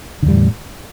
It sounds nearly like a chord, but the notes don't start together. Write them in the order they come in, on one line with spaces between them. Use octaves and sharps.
D3 E2 G3 A2